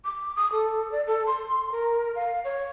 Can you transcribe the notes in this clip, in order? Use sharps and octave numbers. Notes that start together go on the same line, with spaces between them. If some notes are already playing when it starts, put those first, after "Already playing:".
D6
D#6
A4
D5
A4
C6
A#4
F5
C#5